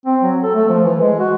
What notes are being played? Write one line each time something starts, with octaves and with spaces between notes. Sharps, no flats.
C4
F#3
A4
A3
F3
E3
G#3
F#4